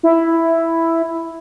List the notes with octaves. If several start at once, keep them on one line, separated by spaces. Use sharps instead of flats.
E4